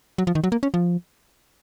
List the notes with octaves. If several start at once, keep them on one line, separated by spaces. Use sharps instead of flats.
F#3
F3
D#3
F#3
A#3
C#4
F3